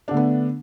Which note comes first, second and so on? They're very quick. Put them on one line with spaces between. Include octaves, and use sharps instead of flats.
D4 D3 A3 B3